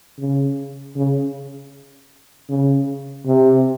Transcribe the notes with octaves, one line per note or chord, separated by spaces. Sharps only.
C#3
C#3
C#3
C3